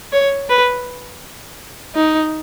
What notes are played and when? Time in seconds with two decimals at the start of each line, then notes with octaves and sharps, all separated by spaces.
0.12 C#5
0.49 B4
1.95 D#4